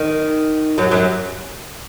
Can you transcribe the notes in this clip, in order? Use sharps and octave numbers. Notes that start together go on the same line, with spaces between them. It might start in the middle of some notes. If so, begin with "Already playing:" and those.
Already playing: D#3
F#2 F#3
F#2 F#3